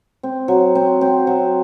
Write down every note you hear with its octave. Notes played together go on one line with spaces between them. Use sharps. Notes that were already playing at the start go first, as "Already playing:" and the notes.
C4
F#3
C4
C4
F#3